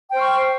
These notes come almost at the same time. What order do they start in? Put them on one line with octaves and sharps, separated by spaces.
G5 C5 F6 C#6